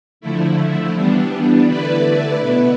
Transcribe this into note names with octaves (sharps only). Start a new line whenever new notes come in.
D3 F3 A3 E4
E3 G3 B3 D4
D3 A3 E4 B4 D5
B2 B3 E4 B4